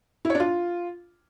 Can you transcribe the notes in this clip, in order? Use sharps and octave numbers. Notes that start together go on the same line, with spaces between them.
E4
C#5
D4
F4